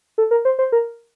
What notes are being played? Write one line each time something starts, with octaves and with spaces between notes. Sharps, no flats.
A4
A#4
C5
C5
A#4